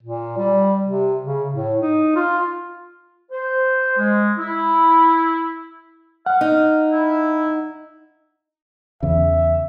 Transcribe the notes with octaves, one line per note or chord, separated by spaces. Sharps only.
A#2
G3
C3
C#3
A2
D#4
F4
C5
G#3
E4
F5 F#5
D#4
E4
E2 C#3 E5